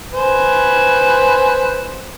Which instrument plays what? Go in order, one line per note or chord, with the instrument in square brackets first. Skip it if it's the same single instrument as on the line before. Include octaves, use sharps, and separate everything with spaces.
[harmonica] B4 C5 G#5